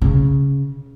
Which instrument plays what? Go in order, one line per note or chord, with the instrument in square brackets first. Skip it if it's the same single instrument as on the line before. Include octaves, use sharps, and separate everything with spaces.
[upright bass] C#3